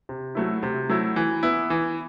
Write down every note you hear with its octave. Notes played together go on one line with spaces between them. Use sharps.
C3
F#3 A3 E4
C3
F#3 A3 E4
E3
B3 E4
E3